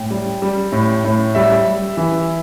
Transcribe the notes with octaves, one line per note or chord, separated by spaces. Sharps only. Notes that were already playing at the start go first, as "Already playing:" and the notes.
Already playing: A2 G5
G3
G3
A2
A2
G3 E5
G3
E3